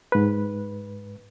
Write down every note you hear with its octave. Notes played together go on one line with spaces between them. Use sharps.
G#2 B4